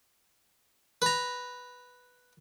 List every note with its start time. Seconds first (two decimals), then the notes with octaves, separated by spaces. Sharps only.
1.02 B4 A#5